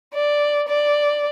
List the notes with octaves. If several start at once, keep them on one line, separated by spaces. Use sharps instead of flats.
D5
D5